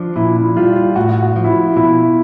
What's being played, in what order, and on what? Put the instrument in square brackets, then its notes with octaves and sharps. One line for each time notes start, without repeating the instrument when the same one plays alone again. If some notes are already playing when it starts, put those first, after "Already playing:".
Already playing: [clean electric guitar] F3 [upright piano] D4
[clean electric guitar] A#2 [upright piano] E4
[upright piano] E4
[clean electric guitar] G3 [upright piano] F4
[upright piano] F4
[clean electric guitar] A2 [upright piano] F#4
[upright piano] F#4
[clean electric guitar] F3
[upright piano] E4
F4
[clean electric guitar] B2 [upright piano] E4